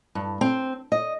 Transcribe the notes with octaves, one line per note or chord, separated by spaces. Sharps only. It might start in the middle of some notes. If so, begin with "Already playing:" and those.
G2
C4
D#5